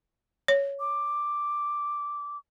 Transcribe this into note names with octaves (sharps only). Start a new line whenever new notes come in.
C#5
D6